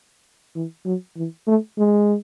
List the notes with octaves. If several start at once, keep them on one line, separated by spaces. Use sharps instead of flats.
E3
F#3
E3
A3
G#3